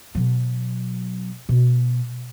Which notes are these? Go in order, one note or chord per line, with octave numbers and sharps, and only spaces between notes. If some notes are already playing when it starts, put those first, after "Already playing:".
B2 F#3
B2